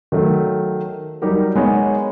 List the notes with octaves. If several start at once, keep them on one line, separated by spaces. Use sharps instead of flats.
D#3 F#3 A3
F#3 G3 D#4 G4 A#4
G#3 B3 D#4 C#5 D#5